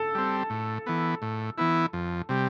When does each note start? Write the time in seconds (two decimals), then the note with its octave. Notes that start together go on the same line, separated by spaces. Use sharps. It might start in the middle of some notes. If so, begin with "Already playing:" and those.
Already playing: A4
0.15 G3 C4
0.50 A2
0.86 E3 B3
1.22 A2
1.58 E3 B3 E4
1.93 F2
2.29 C3 G3